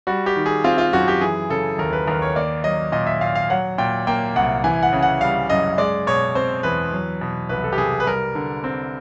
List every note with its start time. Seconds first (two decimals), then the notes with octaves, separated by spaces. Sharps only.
0.07 G3 F#4
0.26 G4
0.36 D#3
0.46 G#4
0.64 C4 F4
0.78 F4
0.93 F#2 F#4
1.08 G4
1.21 E3 G#4
1.50 C#3 A4
1.78 D#2 A#4
1.93 B4
2.07 D#2 A#4
2.22 C#5
2.36 A#3 D5
2.64 F#3 D#5
2.92 A#2 D#5
3.07 E5
3.21 A#2 F5
3.35 F5
3.50 F#3 F#5
3.78 A#2 G5
4.07 A#3 G5
4.36 C2 F#5
4.64 E3 G#5
4.83 F#5
4.93 C#3
5.02 F#5
5.21 G3 F5
5.50 F#2 D#5
5.78 G#3 D5
6.07 B2 C#5
6.35 C4 C5
6.63 E2 B4
6.92 F#3
7.21 B2
7.49 C2 B4
7.64 A4
7.73 G4
7.78 C2 G#4
8.00 B4
8.06 G3 A#4
8.35 D3
8.64 C4